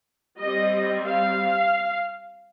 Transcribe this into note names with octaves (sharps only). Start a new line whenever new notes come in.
G3 C4 D#5
F5